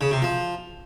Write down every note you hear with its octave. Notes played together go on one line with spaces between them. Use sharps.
C#3
C3
F3